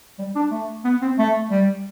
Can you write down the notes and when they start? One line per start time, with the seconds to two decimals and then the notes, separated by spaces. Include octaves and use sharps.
0.19 G3
0.35 D4
0.51 A3
0.85 B3
1.02 C4
1.18 A3
1.51 G3